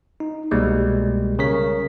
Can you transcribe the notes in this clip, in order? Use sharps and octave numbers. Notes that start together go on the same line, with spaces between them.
D#4
C2 B2 G3 G#3 A#3
C#3 A#4 C#5 B6